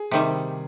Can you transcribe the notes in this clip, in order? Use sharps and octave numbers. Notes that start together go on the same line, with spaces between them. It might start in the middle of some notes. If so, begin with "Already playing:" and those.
Already playing: G#4
C3 D#3 G3